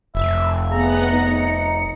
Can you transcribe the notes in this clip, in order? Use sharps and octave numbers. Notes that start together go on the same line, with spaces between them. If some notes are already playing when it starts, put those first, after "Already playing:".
F1 E5
B3 G#4 F#5 A#5
D#4 C#7